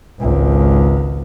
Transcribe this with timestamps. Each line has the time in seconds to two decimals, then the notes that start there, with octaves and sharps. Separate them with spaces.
0.20 G#1 C#2